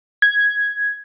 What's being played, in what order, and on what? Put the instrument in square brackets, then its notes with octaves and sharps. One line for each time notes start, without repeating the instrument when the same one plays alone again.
[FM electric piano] G#6